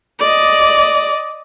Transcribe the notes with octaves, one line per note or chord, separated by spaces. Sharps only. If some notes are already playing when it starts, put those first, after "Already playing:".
D5 D#5